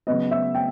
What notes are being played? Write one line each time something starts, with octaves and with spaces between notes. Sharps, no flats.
C#3 F#3 B3 D#5
E5
G5